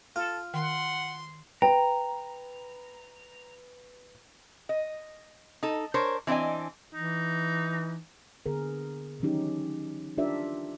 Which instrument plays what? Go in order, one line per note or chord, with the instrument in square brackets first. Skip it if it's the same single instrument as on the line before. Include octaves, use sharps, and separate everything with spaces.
[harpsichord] F4 [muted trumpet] A4
[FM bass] D#3 [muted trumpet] F#5 [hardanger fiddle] C6
[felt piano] B4 [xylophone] G5 [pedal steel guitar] A#5
[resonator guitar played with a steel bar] D#5
D#4 A4
D4 A#4 C5 C#5
E3 C4 D4 D#5 G#5
[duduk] E3 [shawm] D#4
[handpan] D3 B3 G#4 A#4
D#3 E3 F#3 C#4 D#4 G4
D4 F4 G4 A#4 D5 E5